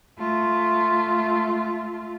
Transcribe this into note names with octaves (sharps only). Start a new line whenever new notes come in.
A3 F4